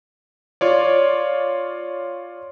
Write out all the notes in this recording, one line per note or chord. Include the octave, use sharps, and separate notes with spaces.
F4 C#5 D5